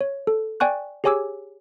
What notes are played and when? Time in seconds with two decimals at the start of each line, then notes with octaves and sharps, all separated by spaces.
0.01 C#5
0.27 A4
0.60 D5 G5 G#5 C#6 F#6
1.04 G4 G#4 C#5 G#5 D6 E6